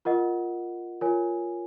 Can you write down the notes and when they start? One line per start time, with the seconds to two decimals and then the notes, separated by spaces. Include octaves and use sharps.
0.05 F4 A#4 D#5 F#5
1.01 F4 A#4 C#5 G#5